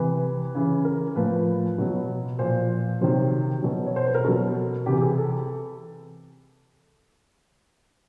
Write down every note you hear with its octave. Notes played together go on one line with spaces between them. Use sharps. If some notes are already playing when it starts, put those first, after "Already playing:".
Already playing: C3 E3 B4
C#3 E3
A#4
A2 F3 B4
B2 F#3
A#2 F3 C5
C3 D#3 F#3 C5
B2 F#3
C#5
C5
B4
A#4
B2 F#3 A4
C3 E3 G4
G#4
A4